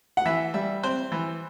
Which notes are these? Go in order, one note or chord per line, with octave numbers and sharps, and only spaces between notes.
F#5
E3 E5
G3 E5
C4 C5
E3